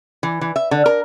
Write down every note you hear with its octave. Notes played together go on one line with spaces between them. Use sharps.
E3
E3
E5
D3
A#4